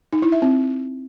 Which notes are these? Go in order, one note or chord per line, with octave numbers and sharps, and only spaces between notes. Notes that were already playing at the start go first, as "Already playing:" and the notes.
D#4
E4
E5
C4